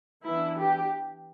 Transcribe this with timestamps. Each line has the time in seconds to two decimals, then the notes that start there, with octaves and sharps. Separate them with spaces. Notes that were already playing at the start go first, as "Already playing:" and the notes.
0.24 E3 B3 D4 E4
0.58 G4